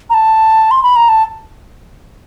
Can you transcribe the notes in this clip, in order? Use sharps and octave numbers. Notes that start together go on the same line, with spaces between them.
A#5
A5
C6
B5
A#5
A5